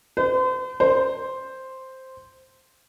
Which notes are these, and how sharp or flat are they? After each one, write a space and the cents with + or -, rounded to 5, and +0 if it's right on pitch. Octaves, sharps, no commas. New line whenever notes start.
C5 -40
C5 +0